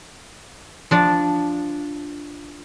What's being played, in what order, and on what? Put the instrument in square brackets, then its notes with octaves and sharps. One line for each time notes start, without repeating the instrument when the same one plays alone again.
[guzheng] F3 D4 D5